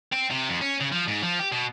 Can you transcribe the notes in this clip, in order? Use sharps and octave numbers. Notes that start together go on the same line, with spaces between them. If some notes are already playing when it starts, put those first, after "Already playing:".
C4
C3
F2
C#4
C#3
F3
G#2
F3
G4
B2